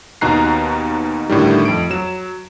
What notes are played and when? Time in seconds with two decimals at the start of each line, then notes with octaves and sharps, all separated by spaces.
0.21 D#2 B2 D#4 A#5 F#6 C7
1.29 A2 D3 D#3 G3
1.65 F2 D7
1.90 F#3 E7